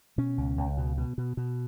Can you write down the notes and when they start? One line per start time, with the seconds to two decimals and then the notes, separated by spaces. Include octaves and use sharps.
0.18 B2 C#4
0.38 C#2
0.58 C#2
0.78 B2
0.97 B2
1.18 B2
1.37 B2